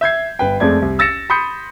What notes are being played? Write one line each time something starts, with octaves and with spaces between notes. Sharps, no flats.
E5 G6 G#6 C7
G1 B4 G5
F2 G#3 A3 D5 G#6
C2
E6 A6 A#6 C#7 E7
B5 C6 D#6 G6 C#7